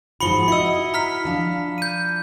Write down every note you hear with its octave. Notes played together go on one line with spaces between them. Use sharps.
G#2 F3 F#4 B5 C#7 G7
E4 F#4 D#5 E6 C#7
A#5 F6 B6
F3 D4 F5
G6 D#7